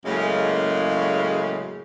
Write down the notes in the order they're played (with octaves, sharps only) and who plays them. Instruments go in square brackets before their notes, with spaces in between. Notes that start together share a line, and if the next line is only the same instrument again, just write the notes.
[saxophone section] F#2 A2 C#3 G#3 A#3